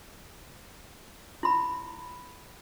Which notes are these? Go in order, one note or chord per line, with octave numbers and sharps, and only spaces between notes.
E4 B5